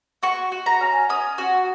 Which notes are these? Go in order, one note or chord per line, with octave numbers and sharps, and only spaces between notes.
F#4 C#6
F#4
A#5
C#4
C#4 D#6
F#4